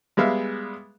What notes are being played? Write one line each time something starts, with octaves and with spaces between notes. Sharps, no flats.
G3 G#3 B3 E5 F5